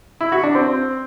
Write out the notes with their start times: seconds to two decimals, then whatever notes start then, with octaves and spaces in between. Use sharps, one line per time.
0.21 E4
0.32 F#4
0.43 D4
0.55 C4